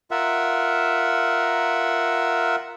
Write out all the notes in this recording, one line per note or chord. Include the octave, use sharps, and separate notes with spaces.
F4 A#4 E5 F#5